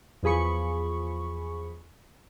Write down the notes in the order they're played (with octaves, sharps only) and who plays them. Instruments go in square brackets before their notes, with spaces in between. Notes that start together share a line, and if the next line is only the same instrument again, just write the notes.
[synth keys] E2 F3 G#4 B5 C#6